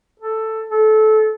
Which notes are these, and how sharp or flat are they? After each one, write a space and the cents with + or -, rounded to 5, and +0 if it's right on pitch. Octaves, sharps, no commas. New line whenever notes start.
A4 +5
A4 -20